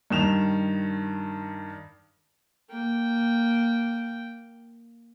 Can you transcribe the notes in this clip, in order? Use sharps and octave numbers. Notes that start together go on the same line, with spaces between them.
G2 D#3 E7 F7
A#3 G5